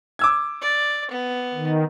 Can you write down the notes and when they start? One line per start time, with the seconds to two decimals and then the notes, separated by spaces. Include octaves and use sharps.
0.19 D6 E6 G#6
0.62 D5
1.11 B3
1.54 D#3